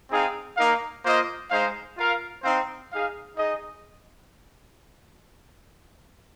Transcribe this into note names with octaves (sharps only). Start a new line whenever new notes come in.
C4 D#4 G#4 F5
A#3 D#4 A#4 F5
A#3 F4 C5 D#5
G#3 D#4 C5 F5
F4 A#4 F5
C4 D#4 C5 F5
D#4 G#4 F5
D#4 G#4 D#5